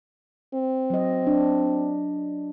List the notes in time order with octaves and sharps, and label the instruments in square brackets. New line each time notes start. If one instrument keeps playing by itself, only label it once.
[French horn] C4
[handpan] F#3 D#5
D4